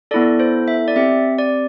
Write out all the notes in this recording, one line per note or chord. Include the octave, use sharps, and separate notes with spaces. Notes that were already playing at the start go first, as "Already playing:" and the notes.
B3 E4 A4 D5
C5
E5
D5
C4 G4 E5
D5